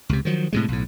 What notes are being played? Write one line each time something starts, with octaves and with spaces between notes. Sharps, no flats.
C#2 C3
D#3 F3 F#3
A2 C3 G#3
B1 A2